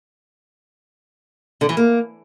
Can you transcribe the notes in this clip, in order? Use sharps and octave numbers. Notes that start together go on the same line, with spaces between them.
D3
E3
A#3